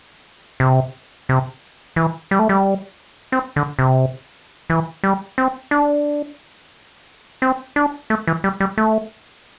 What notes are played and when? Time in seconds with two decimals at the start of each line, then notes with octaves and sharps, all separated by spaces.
0.60 C3
1.29 C3
1.96 E3
2.31 G3
2.39 A3
2.49 G3
3.32 C4
3.56 D3
3.79 C3
4.70 E3
5.04 G3
5.38 C4
5.71 D4
7.42 C4
7.76 D4
8.10 A3
8.27 E3
8.44 G3
8.60 G3
8.78 A3